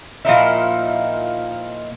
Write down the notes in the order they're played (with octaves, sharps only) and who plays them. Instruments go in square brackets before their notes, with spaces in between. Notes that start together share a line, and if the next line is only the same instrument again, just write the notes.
[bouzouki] A#2 F3 D#4 E4